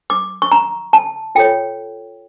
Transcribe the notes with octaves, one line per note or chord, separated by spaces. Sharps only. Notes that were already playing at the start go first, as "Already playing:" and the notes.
D6
C#6
A#5
A5
F4 A4 C#5 G5